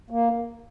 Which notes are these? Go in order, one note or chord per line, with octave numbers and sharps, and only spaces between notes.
A#3